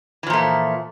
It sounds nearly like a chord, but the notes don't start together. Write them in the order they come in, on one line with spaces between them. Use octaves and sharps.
E3 F3 A#2 A3